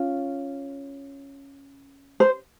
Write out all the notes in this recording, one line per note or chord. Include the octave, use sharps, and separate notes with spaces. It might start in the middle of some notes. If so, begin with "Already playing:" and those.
Already playing: C#4 F4
C5